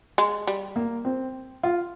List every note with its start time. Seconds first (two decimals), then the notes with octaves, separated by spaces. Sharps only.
0.18 G#3
0.47 G3
0.76 A#3
1.05 C4
1.63 F4